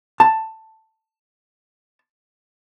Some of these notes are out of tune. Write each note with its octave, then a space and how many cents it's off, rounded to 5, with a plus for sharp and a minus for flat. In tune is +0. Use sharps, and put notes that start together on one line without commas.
A5 +10